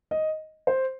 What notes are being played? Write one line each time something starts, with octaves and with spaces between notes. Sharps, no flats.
D#5
C5